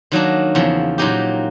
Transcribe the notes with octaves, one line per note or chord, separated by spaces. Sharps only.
D#3 F#3 A#3 D4
E2 C#3 F3
A#2 F#3 A#3 D#4 G4